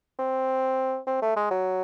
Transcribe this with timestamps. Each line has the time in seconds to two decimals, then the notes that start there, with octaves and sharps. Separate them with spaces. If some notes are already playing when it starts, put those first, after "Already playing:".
0.19 C4
1.07 C4
1.22 A3
1.36 G#3
1.51 F#3